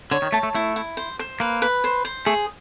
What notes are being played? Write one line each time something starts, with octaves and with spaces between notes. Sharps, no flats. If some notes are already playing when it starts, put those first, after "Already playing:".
D3 C#5
D#3
A3 A5
A3
A3 E4
E4
C5
C5
A#3 B4
B4
C5
C5
A3 G#4